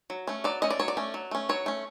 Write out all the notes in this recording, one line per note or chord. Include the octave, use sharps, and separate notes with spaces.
F#3
A3 C#4
F#3 D5
A3 C#4 D#5
D5
F#3 C#5
D5
A3 C#4
F#3
A3 C#4
F#3 C#5
A3 C#4